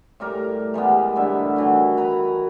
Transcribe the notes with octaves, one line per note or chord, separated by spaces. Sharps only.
A2 G3 A#4 D6
E3 G3 G#3 B3
A2 D3 G3 E5
D#3 E3 F#3
B4 A#5 B5